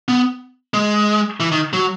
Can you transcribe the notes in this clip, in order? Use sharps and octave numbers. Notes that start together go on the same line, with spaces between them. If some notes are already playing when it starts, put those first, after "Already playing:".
B3
G#3
E3
D#3
F#3